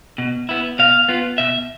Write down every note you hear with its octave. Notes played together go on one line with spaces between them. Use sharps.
B2
B3 E4
B2 F5
B3 F4
B2 E5